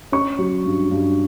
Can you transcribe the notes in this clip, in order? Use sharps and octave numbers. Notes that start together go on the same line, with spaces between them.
C#4 C#6
F#3
G2
G2